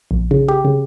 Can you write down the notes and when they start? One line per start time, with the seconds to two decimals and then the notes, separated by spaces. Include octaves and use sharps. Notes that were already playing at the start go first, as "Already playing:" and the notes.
0.11 A#1
0.31 C#3
0.48 G4
0.65 C#3